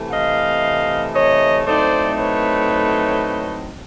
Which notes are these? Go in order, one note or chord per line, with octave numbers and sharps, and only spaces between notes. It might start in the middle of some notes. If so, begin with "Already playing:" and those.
Already playing: C3 E3 A3
D#5 F5
C#5 D#5
A2 F#3 A3 C4 D#4 C5 D5
B4 C#5